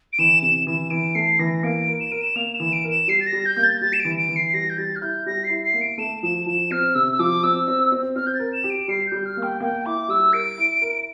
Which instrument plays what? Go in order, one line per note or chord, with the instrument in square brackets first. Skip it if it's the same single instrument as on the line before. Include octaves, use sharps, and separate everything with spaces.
[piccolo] D7
[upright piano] E3 [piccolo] E7
[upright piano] C3 [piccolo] E7
[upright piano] E3 [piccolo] E7
[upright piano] E3 [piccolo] D7
[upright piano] A3 [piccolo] C7
[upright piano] E3 [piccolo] A#6
[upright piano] A#3 [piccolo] D7
[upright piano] A#4
[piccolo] E7
[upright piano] A#4 [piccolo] D7
[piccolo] E7
[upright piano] A#3 [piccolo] F7
[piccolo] E7
[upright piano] E3
[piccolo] D7
[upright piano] A#4
[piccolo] E7
[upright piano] G3 [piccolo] C7
[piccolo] A6
A#6
[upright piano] G3
[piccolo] G6
[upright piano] A#3
[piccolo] A6
[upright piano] G3 [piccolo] A6
[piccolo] E7
D7
[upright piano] E3
[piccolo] D7
[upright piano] E3
[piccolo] C7
[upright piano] G3 [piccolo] A#6
[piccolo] G6
[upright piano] G3 [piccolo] A6
[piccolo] F6
[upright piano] E4 [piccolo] G6
[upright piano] G3 [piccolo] A#6
[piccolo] C7
[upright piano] E4
[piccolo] C7
[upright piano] A#3
[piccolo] D7
[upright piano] A3 [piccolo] E7
[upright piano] F3 [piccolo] E7
[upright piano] F3 [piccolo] E7
[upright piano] C4 [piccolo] F6
[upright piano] C3 [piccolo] E6
[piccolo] E6
[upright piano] F3 [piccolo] D6
[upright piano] C4 [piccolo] E6
[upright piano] C4
C4
[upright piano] C4 [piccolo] F6
[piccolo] G6
A6
[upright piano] A#4
[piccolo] E7
[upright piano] G4
[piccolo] D7
[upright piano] G3 [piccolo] C7
[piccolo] G6
[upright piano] G3
[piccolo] F6
[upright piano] A#3
[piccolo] G5
[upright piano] A#3 [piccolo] G5
[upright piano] E4 [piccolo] D6
[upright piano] G3 [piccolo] E6
[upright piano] A#4 [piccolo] D7
[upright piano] E4
A#4